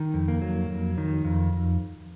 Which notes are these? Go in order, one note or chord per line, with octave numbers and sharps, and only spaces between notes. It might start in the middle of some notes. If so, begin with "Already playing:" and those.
Already playing: D#3
F2
A#3
F#3
F2
D#3
F2